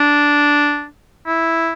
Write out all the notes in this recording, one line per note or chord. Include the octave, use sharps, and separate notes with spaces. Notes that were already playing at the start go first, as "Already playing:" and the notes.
Already playing: D4
E4